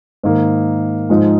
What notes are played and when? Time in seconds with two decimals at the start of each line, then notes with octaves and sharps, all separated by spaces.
0.23 G#2 D#3 A#3
1.09 G#2 F3 G#3 D#4